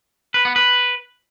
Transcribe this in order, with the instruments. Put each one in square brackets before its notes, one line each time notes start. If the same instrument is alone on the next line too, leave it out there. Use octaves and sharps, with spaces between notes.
[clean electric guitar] B4
B3
B4